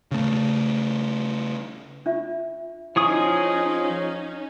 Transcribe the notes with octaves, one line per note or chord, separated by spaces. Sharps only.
C#3 A3
D4 F4 E5
F3 C#4 D#4 E4 G#4 C#6 D#6